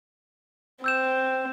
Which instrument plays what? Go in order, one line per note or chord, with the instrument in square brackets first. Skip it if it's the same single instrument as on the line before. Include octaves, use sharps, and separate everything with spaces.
[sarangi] C4 [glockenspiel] E6 G6 E7